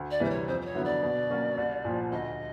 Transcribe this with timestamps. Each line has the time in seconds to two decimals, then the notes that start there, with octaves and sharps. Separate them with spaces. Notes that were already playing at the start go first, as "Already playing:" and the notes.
Already playing: D2
0.11 D5
0.20 C3 E3 G3 C5
0.30 C#5
0.48 F2 C5
0.61 C5
0.65 C#5
0.75 D3 F#3 B3 E4
0.85 D5
1.03 B2
1.30 F#3 A#3 C#4 F#4
1.57 C2
1.85 A#2 F3
2.12 D2 D#5